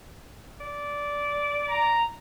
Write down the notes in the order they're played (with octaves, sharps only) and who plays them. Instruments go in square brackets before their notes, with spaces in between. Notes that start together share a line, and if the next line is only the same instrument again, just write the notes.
[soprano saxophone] D5
[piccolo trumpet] A#5